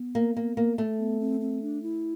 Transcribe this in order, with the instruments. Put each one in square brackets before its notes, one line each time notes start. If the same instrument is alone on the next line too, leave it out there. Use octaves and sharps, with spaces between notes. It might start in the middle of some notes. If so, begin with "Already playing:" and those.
Already playing: [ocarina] B3
[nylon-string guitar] A#3
A#3
A#3
A3
[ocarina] B3
C4
C4
D4
E4